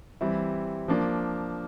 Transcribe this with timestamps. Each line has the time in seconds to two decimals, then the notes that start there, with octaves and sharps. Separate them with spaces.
0.21 E3 G3 C4 E4
0.88 F3 A#3 D4